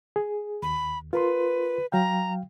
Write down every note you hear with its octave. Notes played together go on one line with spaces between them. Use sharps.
G#4
D#2 B5
F4 A#4 B4 C6
F#3 F5 G5 A#5